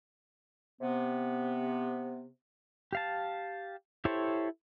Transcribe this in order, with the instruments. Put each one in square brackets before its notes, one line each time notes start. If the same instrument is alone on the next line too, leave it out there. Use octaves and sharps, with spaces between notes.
[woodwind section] C3 B3
[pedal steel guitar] G4 F5 A5
E4 G4 A4 C5 C#5